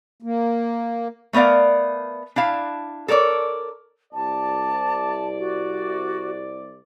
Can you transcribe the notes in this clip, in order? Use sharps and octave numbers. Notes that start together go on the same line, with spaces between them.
A#3
A3 B3 A#4 D5 F5
D4 E4 F5 A5
A4 A#4 C#5 D5
C2 D5 A5
F#4